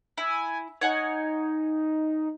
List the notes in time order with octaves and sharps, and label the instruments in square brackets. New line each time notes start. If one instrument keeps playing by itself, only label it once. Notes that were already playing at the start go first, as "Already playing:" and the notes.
[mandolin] E4 [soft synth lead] G#5
[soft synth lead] D#4 [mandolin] C#5 F#5 G#5